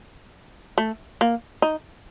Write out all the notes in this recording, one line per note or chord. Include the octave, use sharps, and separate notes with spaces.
A3
A#3
D#4